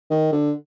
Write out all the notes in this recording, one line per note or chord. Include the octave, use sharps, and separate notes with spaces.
D#3
D3